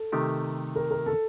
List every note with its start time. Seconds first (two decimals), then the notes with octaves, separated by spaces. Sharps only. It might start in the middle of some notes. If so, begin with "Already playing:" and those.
Already playing: A4
0.12 C3 D#3 A3 D#4 G4
0.76 A#4
0.91 A#4
1.06 A4